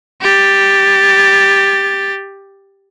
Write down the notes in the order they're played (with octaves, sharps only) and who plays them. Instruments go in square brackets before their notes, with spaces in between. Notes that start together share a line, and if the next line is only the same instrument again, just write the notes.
[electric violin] G4 A6